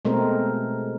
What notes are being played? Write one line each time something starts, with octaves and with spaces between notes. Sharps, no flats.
B2 G#3 A3 C4 A#4